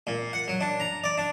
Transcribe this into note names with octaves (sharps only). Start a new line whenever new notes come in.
A#2
F#5
F#3
D4
A#5
D5
D4